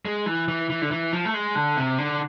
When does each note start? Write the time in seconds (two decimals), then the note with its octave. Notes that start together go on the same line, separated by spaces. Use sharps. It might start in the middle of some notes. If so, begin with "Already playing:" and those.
0.05 G#3
0.26 E3
0.48 E3
0.70 E3
0.82 D3
0.91 E3
1.13 F3
1.25 A3
1.34 G#3
1.55 D3
1.77 C3
1.98 D3